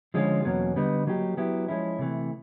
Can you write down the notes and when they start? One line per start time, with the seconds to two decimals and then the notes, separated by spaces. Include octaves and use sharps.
0.14 D3 F3 G#3 C#4 F4
0.45 E2 B2 F#3 A#3 C#4
0.76 D3 G3 B3 D#4
1.07 F#3 A#3 D#4 G4
1.37 F#3 B3 E4 G4
1.68 F3 G#3 C#4 E4
1.99 C3 E3 A3